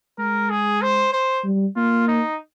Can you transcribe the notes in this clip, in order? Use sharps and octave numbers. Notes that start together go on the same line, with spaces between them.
G#3 A#4
G#4
C5
C5
G3
A#3 F4
D#4